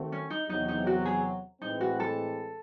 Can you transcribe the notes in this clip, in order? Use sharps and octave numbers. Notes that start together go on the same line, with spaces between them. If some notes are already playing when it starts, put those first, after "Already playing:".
Already playing: D#3 A3 C4 F#4
C#4
D#4
E2 C3 F#3 D#4
D#4
F#4
G#4
A2 E3 G#3 C4 D#4
F#4
A4